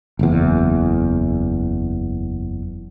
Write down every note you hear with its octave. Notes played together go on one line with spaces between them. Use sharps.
F#1 E2